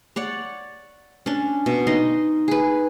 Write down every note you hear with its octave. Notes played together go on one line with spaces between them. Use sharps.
C#5 D5 F#5
C#4 D4
B2
D#4 D#5 C6
G#4 B4